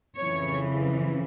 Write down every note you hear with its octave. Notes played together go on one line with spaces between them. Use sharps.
F2 C#3 E3 C#5